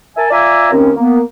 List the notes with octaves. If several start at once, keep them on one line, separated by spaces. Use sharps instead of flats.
A#4 E5 G#5 A5
F4 D5 E5 G#5 A#5 E6
D#2 C4 C#4
A#3 B3